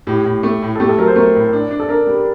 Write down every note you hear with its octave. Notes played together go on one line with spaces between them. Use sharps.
A2 G4
A2
A3
A2
A4
A3 G4
A4
F#3 A#4
C5
A3 A#4
A2
D4
D4
A4
D4 A#4
G3